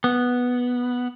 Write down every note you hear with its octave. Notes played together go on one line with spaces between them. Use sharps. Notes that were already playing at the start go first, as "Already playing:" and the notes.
B3